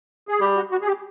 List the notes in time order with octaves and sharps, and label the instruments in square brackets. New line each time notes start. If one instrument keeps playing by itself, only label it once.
[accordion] G#4
[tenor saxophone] G3 [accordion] G4
[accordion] F#4
F#4
G#4
G4